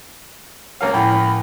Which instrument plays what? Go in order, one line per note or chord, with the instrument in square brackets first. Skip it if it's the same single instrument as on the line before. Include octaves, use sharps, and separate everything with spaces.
[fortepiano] C#2 A#3 F5 [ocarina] C#5
[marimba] A2 F3 E4 [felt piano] F#5 G5 [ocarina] B5